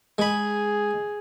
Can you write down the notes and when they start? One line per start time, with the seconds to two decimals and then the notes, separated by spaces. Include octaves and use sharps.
0.18 G#3 G#4 B5